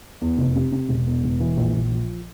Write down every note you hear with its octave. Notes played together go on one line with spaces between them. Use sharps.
E2
F1
C3
C3
E1
E2
E1
E3
A#1
A#1
F3